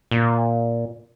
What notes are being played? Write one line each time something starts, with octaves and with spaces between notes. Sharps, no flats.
A#2